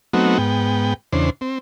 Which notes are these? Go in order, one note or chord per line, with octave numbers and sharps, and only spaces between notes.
F#3 A3 B3 C4 D#4 F#4
G#2 B3 G5
E2 C#3 D4 C5
C4